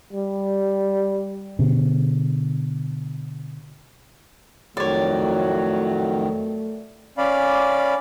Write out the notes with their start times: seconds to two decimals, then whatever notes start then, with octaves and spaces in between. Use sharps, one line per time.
0.13 G3
1.59 B2 D3
4.77 F2 A2 D#3 F#3 A3 C#5 D5
7.18 C#4 D5 F5 B5